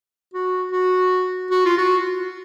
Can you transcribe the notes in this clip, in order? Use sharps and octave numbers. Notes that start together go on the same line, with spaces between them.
F#4
F#4
F#4
F4
F#4